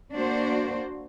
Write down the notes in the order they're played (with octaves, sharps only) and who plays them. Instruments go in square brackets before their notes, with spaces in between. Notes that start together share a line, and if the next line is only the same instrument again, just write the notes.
[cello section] A#3 D4 F#4 C5